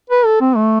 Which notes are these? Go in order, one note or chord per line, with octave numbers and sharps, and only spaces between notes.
B4
A4
C4
A3